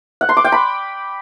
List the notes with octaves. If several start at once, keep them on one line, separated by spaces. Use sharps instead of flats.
F#5
C6
D6
G5
B5